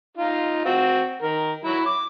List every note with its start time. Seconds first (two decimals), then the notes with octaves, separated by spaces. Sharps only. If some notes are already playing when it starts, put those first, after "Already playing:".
0.17 D#4 F4
0.65 C4 F#4
1.22 D#3 A#4
1.65 F#3 E4
1.86 D6